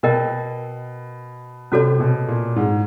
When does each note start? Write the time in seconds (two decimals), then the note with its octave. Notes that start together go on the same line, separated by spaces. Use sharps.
0.03 B2 A#4 D#5 G5
1.72 C3 C#4 F#4 A4 C#5
2.00 B2
2.28 A#2
2.56 G#2